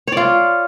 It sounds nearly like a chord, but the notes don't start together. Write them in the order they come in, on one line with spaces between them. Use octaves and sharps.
C#5 D5 F4